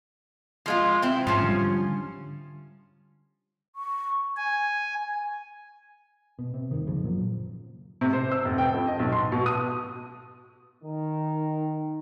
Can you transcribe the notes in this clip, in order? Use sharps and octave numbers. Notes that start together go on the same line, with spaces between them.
F3 G#3 F4
C4 E4
G#2 F3 C#4
D3 G3
C#6
G#5
B2
C3
G1 D#2 D#3
F#1 C#3 F3
F#2 A#2 F#3
C3
C5
E6
F1
G5
F2
D#5
B1
C6
B2
D#6
D#3